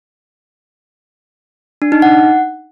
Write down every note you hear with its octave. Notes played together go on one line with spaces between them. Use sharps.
D4
D#4
F#5